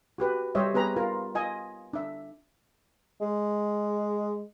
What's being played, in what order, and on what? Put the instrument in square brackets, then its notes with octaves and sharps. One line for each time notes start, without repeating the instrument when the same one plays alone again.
[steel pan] F#4 G4 B4
G3 G4 C5 C#5 D#5 E5
B3 G4 G#4 B4 A#5 B5
F4 A#4
F4 D#5 G#5
D4 E5
[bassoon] G#3